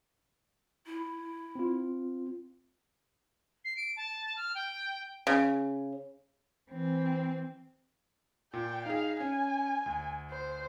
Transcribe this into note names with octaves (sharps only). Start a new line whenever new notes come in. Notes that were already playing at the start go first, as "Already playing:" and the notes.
E4
C4 F4
C7
D7
A5
F6
G5
C#3
E3 C4
A#2 G5
D#4 G#4 F5
C#4 G#5
D2
C5